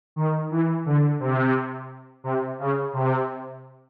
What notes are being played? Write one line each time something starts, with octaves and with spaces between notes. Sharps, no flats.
D#3
E3
D3
C3
C3
C#3
C3